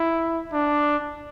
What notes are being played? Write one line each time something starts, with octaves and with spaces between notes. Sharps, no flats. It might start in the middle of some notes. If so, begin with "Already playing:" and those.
Already playing: E4
D4